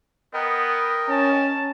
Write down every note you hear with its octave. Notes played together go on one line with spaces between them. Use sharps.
B3 A#4 D#5 G5
C#4 A5